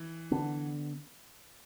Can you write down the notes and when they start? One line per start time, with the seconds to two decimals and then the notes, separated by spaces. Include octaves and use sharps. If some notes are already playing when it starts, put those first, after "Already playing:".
Already playing: E3
0.31 D3 B3 D4